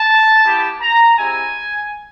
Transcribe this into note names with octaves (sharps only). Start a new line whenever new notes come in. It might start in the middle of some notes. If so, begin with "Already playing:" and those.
Already playing: A5
B3 E4 G4
A#5
G#3 C4 E4 G4 G#5